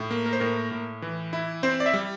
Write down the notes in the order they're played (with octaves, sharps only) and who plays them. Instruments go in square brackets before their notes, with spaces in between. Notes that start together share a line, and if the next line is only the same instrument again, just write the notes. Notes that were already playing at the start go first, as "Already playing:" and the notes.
Already playing: [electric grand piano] A2
A#3
A#4
C5
A2 A#4
A2
E3
E4
C4 C5
D5
E5
G3